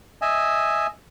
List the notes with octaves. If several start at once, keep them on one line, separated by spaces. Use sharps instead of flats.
D#5 E5 G#5